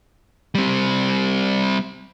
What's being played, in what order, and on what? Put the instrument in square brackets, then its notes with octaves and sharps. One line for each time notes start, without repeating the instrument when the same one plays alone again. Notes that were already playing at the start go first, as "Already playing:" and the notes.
[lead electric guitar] G3 C4